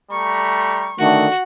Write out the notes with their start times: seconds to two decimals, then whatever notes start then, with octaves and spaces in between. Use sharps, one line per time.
0.11 G3 A3 A#5 C#6
0.99 D3 D#3 A3 F#4